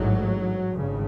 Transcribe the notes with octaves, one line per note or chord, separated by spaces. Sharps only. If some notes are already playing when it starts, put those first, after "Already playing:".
Already playing: A1 G#2 F#3
G#1 C#3
G2